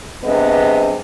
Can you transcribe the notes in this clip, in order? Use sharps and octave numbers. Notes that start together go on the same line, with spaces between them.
G2 C3 B3 G#4 D#5